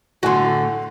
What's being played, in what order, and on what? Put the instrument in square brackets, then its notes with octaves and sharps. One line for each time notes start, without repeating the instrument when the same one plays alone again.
[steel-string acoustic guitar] A2 A3 [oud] D3 F#4 [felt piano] F#5 G#5 C6